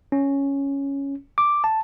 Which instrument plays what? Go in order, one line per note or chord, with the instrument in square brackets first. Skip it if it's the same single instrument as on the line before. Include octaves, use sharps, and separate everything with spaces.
[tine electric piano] C#4
D6
A5